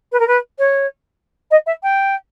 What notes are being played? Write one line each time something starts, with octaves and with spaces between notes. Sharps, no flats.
B4
A#4
B4
C#5
D#5
E5
G5